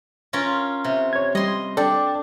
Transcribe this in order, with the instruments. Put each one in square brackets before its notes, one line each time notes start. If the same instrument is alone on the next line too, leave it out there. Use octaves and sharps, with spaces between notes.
[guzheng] C#4 F4 A#4
C3
[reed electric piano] C#5 G#6
[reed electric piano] G3 [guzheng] D#5 C6
[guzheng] D4 [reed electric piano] A4 D5 G5